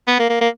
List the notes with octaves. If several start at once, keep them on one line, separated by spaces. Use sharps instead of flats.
B3
A#3
A#3
A#3